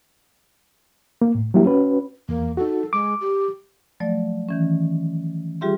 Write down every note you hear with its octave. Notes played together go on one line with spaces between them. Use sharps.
A#3
A2
F#3 G3 A#3 E4 G4
C#4 F#4 B4
E2 A#3
D#4 F#4 A4
G#3 D6
G4
F3 F#3 A3 D5
D#3 E3 C#4
G3 F4 G4 G#4 E5 C6